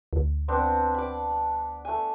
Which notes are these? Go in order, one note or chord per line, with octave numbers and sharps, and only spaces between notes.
D2
B3 C4 D4
B5 D6
A3 G#5